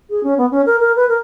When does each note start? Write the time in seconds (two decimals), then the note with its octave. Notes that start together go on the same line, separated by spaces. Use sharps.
0.10 G#4
0.23 C#4
0.38 B3
0.51 C#4
0.66 A#4
0.79 A#4
0.96 B4
1.09 A#4